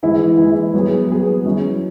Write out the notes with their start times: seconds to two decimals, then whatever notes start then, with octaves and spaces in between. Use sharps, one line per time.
0.03 E3 G#3 E4
0.38 E3 G#3 E4
0.74 F#3 B3 G#4
1.09 F#3 B3 G#4
1.45 F#3 C#4 E4 G#4